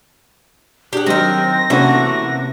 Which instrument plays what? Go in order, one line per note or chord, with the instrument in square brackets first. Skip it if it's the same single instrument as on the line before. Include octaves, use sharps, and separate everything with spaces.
[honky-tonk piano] D4 [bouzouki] G4 F#5 [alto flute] G#4
[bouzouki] D#3 A#4 [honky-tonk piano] F#3 [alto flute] C4 [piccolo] A#6
[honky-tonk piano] C3 A#3 C#4 [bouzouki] E3 A3 [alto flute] F#4